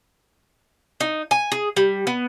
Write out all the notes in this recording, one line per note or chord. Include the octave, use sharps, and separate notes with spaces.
D#4
G#5
G#4
G3
B3